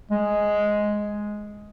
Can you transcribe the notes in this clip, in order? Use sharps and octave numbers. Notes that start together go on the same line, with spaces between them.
G#3